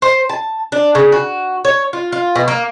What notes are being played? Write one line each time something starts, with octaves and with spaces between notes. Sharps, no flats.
C5
A5
D4
C#3
F#4
C#5
F4
F4
B2
A#3